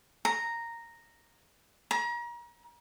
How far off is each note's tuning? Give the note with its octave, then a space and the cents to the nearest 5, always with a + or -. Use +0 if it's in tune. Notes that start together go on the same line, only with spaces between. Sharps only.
A#5 -5
A#5 +35